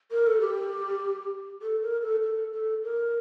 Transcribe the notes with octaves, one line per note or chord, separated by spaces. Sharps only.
A#4
A4
G4
A4
A#4
A4
A4
A4
A#4